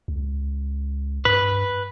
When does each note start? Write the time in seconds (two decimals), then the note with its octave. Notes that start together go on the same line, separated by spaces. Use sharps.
0.08 C#2
1.25 G2 B4